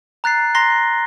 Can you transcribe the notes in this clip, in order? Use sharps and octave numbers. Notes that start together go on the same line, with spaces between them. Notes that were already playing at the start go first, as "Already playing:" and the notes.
A#5 F#6 A6 C7
A#5 C6 A#6 C7 G7